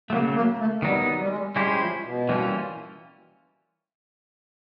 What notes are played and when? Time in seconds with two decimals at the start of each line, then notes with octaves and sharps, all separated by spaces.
0.10 C#3 F#3 A3 A#3
0.34 A#3
0.58 A3
0.82 D#3 F#3 G3 B3 D#4
1.19 G3
1.28 G#3
1.38 G3
1.55 G3 G#3 C#4 E4 G4 C5
1.80 F3
2.04 B2
2.29 E3 G3 A#3 C#4 F4